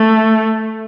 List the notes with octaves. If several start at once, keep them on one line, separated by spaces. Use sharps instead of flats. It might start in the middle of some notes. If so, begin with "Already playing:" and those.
Already playing: A3